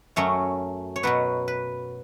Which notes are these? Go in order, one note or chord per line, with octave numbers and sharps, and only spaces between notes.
F#2 F#3 A3 C#4 C#5
C#5
B2 F#3 B3 B4
B4